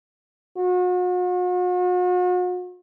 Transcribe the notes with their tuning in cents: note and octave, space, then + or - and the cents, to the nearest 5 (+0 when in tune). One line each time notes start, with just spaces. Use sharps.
F#4 -45